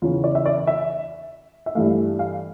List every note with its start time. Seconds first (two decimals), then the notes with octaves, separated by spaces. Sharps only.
0.02 E2 C#3 E3 F4
0.24 D5
0.35 E5
0.46 D5
0.67 E5
1.66 E5
1.75 G2 E3 A3 F5
2.19 F5